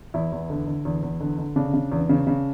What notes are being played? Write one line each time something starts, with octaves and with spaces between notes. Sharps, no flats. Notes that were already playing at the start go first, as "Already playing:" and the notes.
E2 E4
E2
D3
D3
E2
E2
D3
D3
C#3 D4
C#3
E2
C#3
C#3